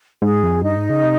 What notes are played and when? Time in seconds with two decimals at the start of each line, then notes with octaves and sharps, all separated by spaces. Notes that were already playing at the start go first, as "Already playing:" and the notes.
0.22 G#2 G#4
0.43 F2
0.63 G2 D#4
0.77 G#2
0.90 C#3
1.03 C3